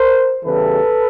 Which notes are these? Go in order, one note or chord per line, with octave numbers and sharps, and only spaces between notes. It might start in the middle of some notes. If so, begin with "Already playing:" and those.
Already playing: A#4 C5
E2 C#3 E3 G3 A4 B4